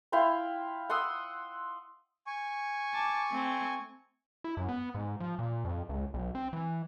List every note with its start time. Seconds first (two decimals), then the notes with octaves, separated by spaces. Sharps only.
0.12 E4 F5 G5 C6
0.90 F#5 C6 D#6 E6
2.27 G#5 C#6
2.93 A5 D6
3.30 A3 C4
4.44 E4
4.57 F#2
4.69 B3
4.95 G#2
5.20 F3
5.39 A#2
5.64 F2
5.89 C#2
6.14 B1
6.35 C4
6.53 E3